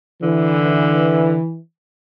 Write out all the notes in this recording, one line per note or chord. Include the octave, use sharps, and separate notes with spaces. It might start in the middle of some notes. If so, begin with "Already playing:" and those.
D3 E3